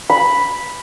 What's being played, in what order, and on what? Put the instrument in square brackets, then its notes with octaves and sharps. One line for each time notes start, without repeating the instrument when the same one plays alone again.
[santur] B5